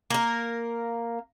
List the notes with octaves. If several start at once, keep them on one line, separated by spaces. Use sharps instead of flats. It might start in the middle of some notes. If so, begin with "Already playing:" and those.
A#3 A#4